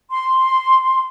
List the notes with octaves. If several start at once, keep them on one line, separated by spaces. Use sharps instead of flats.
C6